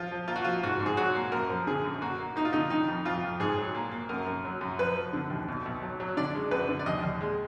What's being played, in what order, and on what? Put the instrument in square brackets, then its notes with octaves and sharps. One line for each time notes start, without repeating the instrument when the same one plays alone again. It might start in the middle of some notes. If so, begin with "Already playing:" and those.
Already playing: [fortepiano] F3 F4
F3
A#3 F4
F#4
F3 F4
G#2 F#4
G#2
G#4
F#3 F#4
A#3
F#2 A#4
F3
D3 G#4
F#2
A#3 F#4
A#3
A#3 D#4
F4
D3 D#4
D#3 D#4
F2
F2 F4
F2
G#2 G#4
F#3
A#3
A#3
F#2 A#4
F#2
F#3
F#2
F3 B4
F3
D3
D#2
B1
B1
F#3
F#3
D3 D5
G#3
F#2 B4
D3
D5
D#2 D#5
D#2
G#3